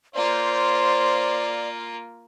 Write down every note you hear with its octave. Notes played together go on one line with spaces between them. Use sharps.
A#3 F4 C5 D5